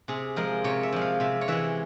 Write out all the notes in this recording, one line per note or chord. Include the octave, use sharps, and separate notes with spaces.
C3 G#4
F3 G#3 A#4
C3 C#5
E5
F3 G#3
F5
C3 E5
C#5
E3 G#3 E5